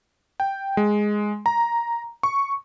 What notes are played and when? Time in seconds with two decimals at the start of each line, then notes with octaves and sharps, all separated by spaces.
0.40 G5
0.77 G#3
1.46 A#5
2.23 C#6